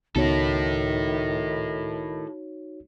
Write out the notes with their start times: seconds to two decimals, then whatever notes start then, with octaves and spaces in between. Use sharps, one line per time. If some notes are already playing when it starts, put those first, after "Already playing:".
0.16 C#2 D#3 B3 D#4 E4 F#4 A4 C#5